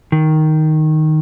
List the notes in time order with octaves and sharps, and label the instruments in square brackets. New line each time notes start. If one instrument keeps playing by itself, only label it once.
[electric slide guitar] D#3